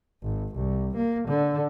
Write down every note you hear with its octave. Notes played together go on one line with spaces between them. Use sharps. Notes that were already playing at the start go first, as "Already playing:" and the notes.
G#1
C2
A#3
D3